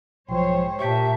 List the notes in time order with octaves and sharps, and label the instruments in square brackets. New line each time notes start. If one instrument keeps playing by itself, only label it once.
[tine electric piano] B1 F3 [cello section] G#2 C5 C#5 [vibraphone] G5
[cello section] A#2 [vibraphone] G4 A5 [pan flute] E5 [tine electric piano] G5 C#6